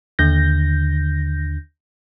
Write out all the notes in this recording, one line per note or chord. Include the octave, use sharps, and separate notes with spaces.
D#2 D3 G6 A#6